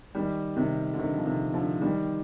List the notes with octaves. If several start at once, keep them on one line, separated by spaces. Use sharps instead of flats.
D#3 G3
C3 D#3
D3
C3 D#3
F3
C3 D#3
D3 F3
D#3 G3